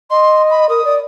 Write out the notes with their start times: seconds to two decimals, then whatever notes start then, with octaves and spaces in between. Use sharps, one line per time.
0.10 D#5 C6
0.50 B5
0.69 A#4 D#6
0.85 D5